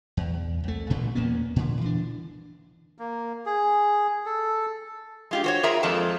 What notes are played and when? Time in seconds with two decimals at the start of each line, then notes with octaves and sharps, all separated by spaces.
0.17 E2
0.64 C2 A3
0.90 A1 A#2 D3
1.15 E2 A#3 B3 C#4
1.56 A#2 D3
1.81 E3 D4
2.98 A#3
3.46 G#4
4.26 A4
5.31 G#3 F4 G4
5.44 F#4 C5 C#5
5.63 F4 G#4 A#4 E5 A#5
5.83 F2 F3 G#3 A4 A5